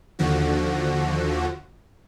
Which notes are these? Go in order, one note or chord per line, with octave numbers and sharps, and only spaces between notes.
D#2 D3 F3 F#4